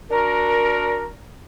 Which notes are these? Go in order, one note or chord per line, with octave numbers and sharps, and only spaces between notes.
D4 F#4 A#4